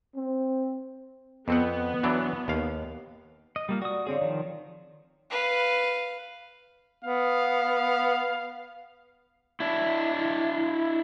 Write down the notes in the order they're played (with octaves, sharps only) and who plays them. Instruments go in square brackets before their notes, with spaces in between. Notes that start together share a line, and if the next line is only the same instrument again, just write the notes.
[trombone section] C4
[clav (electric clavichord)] F2 C4 F#5 [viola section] B3
[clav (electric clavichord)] E3 F#3 D4
D#2 F5
[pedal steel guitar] D#5
G3 A#3 F4
[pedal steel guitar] F#4 D#6 [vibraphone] D5
[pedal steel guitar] D3 C4 G#4 [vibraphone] C#5 D5 F5
[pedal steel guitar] D#3 F3
[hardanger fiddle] B4 F5
[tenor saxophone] B3 [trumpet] F5
[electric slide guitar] D4 E4